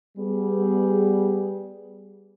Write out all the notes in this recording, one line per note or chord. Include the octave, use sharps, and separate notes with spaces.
G3 B3 G#4